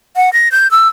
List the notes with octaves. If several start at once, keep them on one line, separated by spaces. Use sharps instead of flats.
F#5
A#6
G6
E6